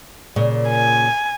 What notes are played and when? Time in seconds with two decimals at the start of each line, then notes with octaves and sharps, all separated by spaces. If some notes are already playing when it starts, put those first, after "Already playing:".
0.36 A#2 C#3
0.68 G#5